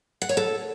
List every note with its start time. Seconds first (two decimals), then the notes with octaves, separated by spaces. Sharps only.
0.22 F#5
0.29 C#5
0.37 A4